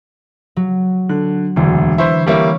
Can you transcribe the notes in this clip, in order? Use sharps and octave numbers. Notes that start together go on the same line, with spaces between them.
F#3
D3 F#6
E1 D2 D3 E3
E4 B4 C5 C#6 E6
G3 A#3 E4 B4 C#5